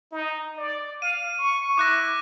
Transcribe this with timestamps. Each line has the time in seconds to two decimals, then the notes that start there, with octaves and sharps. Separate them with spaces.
0.12 D#4
0.57 D5
1.02 F5 D#7
1.39 C#6
1.77 E4 D6 F#6 A#6